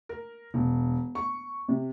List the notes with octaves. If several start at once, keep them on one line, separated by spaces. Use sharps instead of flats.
A#4
E1
C#6
C3